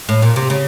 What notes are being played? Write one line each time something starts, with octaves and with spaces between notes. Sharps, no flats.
A2
A#2
C3
C#3